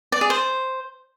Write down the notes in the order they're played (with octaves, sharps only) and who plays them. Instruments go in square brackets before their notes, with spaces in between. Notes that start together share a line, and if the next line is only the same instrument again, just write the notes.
[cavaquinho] D5
G#4
C5